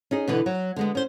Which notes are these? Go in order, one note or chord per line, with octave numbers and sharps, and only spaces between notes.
C#4 D#4 G#4
B2 D3 E3 B4
F#3
D3 G#3 B3
C#4 C5